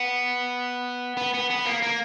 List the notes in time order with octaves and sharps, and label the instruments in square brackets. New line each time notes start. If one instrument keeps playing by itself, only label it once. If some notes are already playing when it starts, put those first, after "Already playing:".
Already playing: [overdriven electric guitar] B3
B3
B3
B3
A#3
A#3